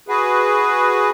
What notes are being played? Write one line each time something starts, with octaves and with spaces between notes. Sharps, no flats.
F#4 G#4 B4